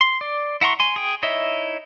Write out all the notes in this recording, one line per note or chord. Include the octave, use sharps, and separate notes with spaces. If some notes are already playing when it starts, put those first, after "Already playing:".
C6
D5
E4 F#5 A#5 C6 C#6
G#5 C6
G#4 G5
D#4 E4 C#5 D#5 E5